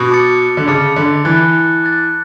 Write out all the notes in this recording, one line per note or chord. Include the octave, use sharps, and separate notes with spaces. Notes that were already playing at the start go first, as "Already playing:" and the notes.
Already playing: B2
A5 D6 A6 C#7
D3
C#3 A5 D6 A6 C#7
D3
E3 D6 F#6 A6
D6 F#6 A6